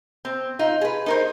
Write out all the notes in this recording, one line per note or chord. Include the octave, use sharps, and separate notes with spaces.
C4
D#4 F4
G#4 B4
D#4 A#4 C5